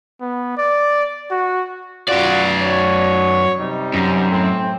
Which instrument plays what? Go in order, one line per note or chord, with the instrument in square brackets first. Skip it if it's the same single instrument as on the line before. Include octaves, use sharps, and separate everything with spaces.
[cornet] B3
D5
F#4
[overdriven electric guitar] F#2 D5 [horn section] F4 F#4
[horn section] F#4 C#5
C3 G3 D#4
[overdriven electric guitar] F#2
[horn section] A2 C4